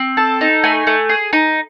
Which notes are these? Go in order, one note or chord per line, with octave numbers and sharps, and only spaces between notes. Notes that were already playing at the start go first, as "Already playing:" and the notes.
Already playing: C4
A4 A5
D#4
A3 G#5
A3
G#4
D#4